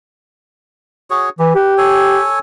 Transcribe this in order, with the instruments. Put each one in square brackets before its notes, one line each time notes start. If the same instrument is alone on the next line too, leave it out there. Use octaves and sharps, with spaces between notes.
[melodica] F#4 G#4 C#5
[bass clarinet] E3 [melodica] G4
[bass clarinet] G4 [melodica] B4
[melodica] A4 C#5 G#5